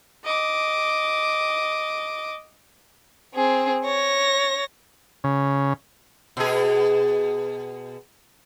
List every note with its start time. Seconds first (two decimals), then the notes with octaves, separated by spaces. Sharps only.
0.25 D#5 D6
3.34 C4 G#4
3.85 C#5 A#6
5.24 C#3
6.37 B2 G#4